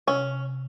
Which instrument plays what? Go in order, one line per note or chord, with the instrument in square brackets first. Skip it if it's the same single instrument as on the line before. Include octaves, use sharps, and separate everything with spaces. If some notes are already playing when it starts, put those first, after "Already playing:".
[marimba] C3 [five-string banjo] C#4